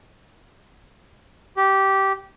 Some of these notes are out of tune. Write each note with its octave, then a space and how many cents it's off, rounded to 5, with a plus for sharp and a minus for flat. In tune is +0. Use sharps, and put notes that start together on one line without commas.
G4 -15